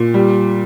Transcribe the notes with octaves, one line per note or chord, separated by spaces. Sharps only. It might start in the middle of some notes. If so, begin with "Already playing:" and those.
Already playing: A#2
G3